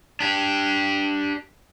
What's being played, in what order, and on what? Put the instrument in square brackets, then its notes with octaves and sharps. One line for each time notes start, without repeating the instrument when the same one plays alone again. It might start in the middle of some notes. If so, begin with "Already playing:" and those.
[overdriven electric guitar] D4 G4